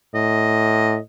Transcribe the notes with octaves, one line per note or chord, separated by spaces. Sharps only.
A2 D#5